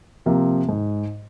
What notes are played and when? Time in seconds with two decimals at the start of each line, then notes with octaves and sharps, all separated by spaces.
0.26 C3 F3 A#3 F4
0.69 G#2